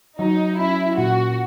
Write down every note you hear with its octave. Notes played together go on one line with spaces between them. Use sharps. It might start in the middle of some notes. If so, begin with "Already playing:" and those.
F#3 D#4
C#4 E4
A#2 F#4